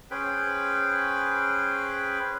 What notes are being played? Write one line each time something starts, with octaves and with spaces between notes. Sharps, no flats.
C#4 G#4 B4 C5 G5 B5